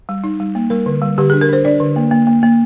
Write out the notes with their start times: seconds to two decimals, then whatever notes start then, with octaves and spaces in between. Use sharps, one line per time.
0.09 G3
0.24 D#4
0.40 G3
0.55 A#3
0.70 G3 A#4
0.86 D3
1.02 G3
1.18 D3 G4
1.30 D4 G#4
1.41 A#4
1.49 D4 C5
1.65 D4 D5
1.80 D3
1.96 A#3
2.11 A#3
2.27 A#3
2.43 A#3